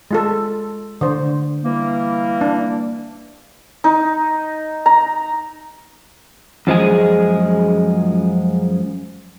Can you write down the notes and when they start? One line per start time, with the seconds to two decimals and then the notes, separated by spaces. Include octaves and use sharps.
0.11 G#3 F4 A4
1.01 D3 C5
1.64 E3 G3 A#3
2.41 D4
3.84 D#4
4.86 A#5
6.67 F#2 F3 G#3 G#4